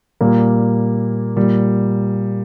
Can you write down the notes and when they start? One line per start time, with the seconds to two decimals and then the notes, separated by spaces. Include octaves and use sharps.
0.21 A#2 G3 A#3
1.36 A#2 G3 A#3